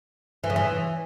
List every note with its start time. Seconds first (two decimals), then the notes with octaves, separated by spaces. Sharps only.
0.44 E3
0.50 C#3
0.56 E3